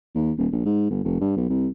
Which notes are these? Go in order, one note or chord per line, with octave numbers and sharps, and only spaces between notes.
D#2
D#1
A#1
G#2
G1
F1
G2
B1
C2